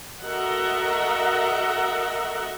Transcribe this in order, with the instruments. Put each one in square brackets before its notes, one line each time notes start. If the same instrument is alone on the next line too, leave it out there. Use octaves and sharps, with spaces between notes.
[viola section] F#4 A4 A#4 D#5 E5 F#5